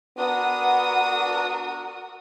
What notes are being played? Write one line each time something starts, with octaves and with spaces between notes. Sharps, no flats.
B3 D4 F#4 A#4 D#6